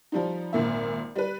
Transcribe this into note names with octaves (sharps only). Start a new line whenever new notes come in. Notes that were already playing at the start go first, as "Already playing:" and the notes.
F3 G3 D#4
G#1 A#2 E5
G3 B4